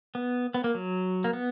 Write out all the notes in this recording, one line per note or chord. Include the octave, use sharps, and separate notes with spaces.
B3
B3
A#3
F#3
A#3
B3